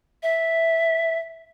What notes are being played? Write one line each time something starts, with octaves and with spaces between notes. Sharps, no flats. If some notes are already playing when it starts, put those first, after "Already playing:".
E5